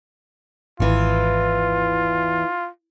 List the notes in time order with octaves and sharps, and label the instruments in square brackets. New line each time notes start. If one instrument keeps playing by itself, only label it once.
[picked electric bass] G#1 [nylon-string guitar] E2 E3 [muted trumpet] F4